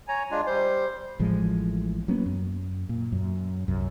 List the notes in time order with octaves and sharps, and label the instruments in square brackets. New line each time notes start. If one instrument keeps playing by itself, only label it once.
[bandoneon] C#5 A#5 [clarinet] G#5
[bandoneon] G#3 D4 F4
[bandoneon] G3 [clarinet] C5
[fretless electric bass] A1 A2 F3 G#3
F#3 A#3 B3 C#4
F#2
A#2
F#2
C2 F#2